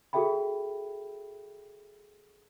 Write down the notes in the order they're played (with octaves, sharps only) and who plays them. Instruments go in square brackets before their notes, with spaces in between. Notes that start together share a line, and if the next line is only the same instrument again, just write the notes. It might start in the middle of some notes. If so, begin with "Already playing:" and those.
[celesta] F#4 G#4 A4 E5 G5 B5